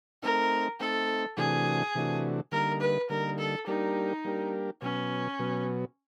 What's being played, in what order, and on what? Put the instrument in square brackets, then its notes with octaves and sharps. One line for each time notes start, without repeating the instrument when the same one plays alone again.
[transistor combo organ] A3 C4 D#4 [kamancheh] A#4
[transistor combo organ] A3 C4 D#4 [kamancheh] A4
[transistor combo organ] C3 E3 A3 D4 F#4 [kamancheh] G#4
[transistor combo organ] C3 E3 A3 D4 F#4
[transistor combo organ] D3 G3 A#3 D#4 [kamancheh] A#4
[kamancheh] B4
[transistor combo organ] D3 G3 A#3 D#4 [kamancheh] A#4
[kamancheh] A4
[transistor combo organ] G3 A#3 D4 G4 A#4 [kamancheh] D#4
[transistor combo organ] G3 A#3 D4 G4 A#4
[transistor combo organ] B2 F#3 B3 [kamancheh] C#4
[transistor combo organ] B2 F#3 B3